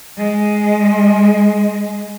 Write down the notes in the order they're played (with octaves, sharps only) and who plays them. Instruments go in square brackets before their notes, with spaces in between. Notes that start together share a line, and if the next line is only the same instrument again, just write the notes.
[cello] G#3